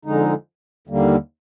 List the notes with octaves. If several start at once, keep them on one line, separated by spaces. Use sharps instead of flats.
F2 D3 G#3 D#4
D#2 D3 G3 A#3